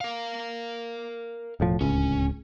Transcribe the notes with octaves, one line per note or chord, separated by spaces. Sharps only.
A#4 F5
E1 A2 F3
D1 C#2 C#4